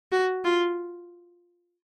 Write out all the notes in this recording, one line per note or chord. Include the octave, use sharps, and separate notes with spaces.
F#4
F4